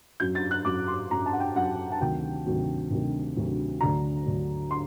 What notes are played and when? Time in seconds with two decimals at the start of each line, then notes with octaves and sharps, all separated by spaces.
0.20 F#2 F#3 G6
0.35 A6
0.51 F#6
0.65 F#2 F#3 D6
0.88 C6
1.11 F#2 F#3 A#5
1.26 A5
1.33 F#5
1.40 G5
1.55 F#2 F#3 F#5
1.92 A5
2.00 D2 C3 D#3 F#3 G5
2.46 D2 C3 D#3 F#3
2.90 D2 C3 D#3 F#3
3.36 D2 C3 D#3 F#3
3.81 D2 D3 F#3 A#5
4.26 D2 D3 F#3
4.71 C6